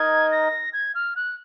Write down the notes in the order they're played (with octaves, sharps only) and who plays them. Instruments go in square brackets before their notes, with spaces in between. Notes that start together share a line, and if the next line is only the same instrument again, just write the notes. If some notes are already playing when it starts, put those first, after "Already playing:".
Already playing: [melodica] D#4 A#4 D#5 [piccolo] G#6
[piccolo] A#6
G#6
F6
F#6